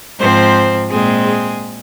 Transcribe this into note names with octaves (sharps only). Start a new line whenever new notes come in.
G#2 F3 C4 C5
A#2 G#3 C4 G#4
G#4